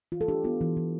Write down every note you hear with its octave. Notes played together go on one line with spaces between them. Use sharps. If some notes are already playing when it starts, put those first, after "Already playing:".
E3 F4
A4
D4 G4
B3 F4
E3
E3